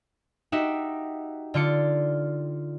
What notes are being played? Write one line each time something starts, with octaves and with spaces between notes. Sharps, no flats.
D#4 F#4 G4 E5
D3 F4 D5 C#7